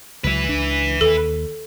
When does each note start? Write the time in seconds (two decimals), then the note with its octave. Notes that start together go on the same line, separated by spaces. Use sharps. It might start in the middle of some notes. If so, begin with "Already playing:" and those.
0.24 C#2 F#3 B4 E5
0.49 C#2 D4
1.01 D#2 A4